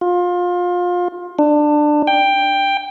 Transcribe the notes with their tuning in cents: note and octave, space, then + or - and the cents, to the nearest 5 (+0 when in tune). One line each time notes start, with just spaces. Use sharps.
F4 +25
D4 +20
G5 +10